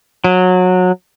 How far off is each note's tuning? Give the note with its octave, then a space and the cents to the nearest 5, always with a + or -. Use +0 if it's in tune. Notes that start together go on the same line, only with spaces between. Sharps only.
F#3 -20